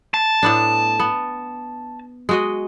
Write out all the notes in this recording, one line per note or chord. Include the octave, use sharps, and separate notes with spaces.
A5
A2 B3 D4
B3
G#3 F#4 D#5